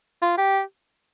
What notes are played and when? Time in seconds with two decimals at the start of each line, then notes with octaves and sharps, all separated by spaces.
0.22 F4
0.38 G4